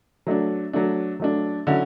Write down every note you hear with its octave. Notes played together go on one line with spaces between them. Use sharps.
F#3 A3 D4
F#3 A3 D4
F#3 A3 D4
D3 F#3 C#4 E4